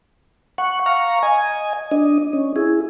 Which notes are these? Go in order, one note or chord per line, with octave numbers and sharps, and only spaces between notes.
F#5 C#6
F5 A#5 C#6
D#5 G#5
D4 D#5
C#4
E4 G#4